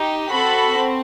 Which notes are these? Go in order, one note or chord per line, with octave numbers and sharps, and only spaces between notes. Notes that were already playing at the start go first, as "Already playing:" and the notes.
Already playing: D#4 G4
C4 F#4 A4 B5
C4